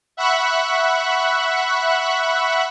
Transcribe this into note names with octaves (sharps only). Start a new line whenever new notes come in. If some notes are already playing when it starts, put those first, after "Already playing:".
E5 F#5 B5 C#6 F#6